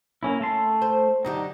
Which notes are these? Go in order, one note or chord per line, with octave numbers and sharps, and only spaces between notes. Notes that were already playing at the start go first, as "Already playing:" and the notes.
A#3 C#4 E4
A3 A5 C6
C5
F#2 D3 D#4 G4